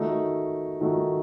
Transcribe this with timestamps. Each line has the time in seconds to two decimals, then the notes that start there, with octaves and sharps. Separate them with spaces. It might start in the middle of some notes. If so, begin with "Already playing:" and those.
Already playing: D#3 A3 D#4 F#4
0.81 D#3 A3 D#4 F#4